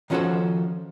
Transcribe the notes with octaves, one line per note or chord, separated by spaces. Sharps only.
D#3 F3 C#4 F#4 A4 C5